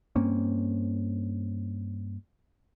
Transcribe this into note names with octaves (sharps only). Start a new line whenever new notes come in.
G2 A#3 C4 C#4